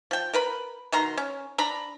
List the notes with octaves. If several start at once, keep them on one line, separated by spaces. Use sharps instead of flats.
F3 G5
A#4 B4 B5
B2 D#3 A#5 C6
C#4
D4 A#5 B5